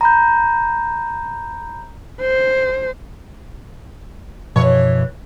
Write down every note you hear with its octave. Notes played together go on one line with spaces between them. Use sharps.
A#5 B5 G6
C5
F#2 B2 E3 F3 C#5